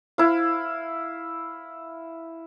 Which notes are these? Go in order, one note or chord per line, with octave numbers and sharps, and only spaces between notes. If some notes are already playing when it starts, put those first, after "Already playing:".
E4 F5